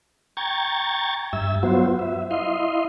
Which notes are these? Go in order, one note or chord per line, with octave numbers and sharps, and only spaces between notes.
G5 A#5 C#6 G#6 A6
G2 E5 E6
F#3 B3 F4 F#4 C5
E5
E4 D#5 F5 C6